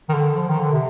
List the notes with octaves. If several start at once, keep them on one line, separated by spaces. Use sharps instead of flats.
D#3
D3
F3
D#3
D3
C3